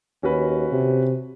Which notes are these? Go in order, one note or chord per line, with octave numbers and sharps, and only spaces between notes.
D#2 C#4 F#4 B4
C3